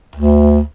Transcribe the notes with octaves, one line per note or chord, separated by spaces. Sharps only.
D2